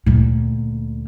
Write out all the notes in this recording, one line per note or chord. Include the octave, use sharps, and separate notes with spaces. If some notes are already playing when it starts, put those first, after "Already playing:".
D2 A#2